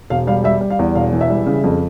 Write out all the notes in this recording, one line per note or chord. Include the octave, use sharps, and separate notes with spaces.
E1 F5
G3 F5
G3 E5
G3
F5
E2
E1 F5
E3
E5
G3
C#3
F2